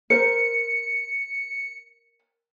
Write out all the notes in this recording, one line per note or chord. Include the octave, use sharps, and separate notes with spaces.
A#4 C5 C#7